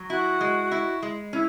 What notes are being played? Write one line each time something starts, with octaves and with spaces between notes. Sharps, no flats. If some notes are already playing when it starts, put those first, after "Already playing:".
Already playing: F#3
E4 F#4
G#3
E4
G#3
C#4 E4